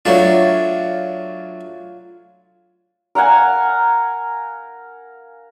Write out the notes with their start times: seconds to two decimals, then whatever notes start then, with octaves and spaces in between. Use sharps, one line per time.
0.05 F#3 A3 D4 F4 C#5
3.15 A#4 F5 F#5 G#5